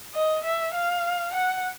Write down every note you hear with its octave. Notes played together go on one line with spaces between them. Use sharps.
D#5
E5
F5
F#5